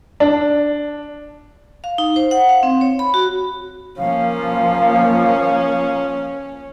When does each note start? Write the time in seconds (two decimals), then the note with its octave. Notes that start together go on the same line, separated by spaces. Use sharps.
0.20 D4
1.84 F5
1.98 D#4
2.16 C5
2.31 F#5
2.49 F5
2.63 C4
2.81 C#5
2.99 B5
3.14 F#4
3.98 F3 A#3 C#4 F5